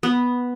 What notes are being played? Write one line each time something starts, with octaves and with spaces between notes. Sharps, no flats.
B3